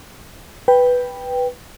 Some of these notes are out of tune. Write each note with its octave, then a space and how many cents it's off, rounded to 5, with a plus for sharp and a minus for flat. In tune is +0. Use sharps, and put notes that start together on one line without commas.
B4 +0 G5 +5